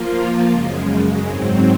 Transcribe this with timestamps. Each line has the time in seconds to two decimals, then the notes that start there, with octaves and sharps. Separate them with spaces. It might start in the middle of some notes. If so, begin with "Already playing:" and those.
Already playing: F3 A#3 F4
0.50 F#2 C#3 G#3
1.24 G#2 F#3 C4